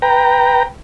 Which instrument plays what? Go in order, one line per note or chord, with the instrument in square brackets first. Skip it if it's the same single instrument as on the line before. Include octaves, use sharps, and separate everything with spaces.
[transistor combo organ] B4 G5 A#5